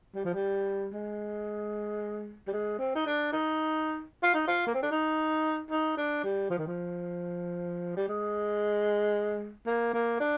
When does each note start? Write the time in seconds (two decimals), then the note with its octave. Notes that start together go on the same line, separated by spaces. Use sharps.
0.15 G3
0.25 F3
0.34 G3
0.94 G#3
2.47 G3
2.53 G#3
2.79 C4
2.95 D#4
3.06 D4
3.33 D#4
4.23 F4
4.34 D#4
4.47 F4
4.67 A#3
4.75 C4
4.82 D4
4.91 D#4
5.71 D#4
5.97 D4
6.23 G3
6.50 F3
6.58 D#3
6.67 F3
7.97 G3
8.08 G#3
9.67 A#3
9.94 A#3
10.20 D4